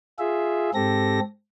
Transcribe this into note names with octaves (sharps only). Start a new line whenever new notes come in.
F4 G#4 E5
G#2 C4 G4 A4 A#6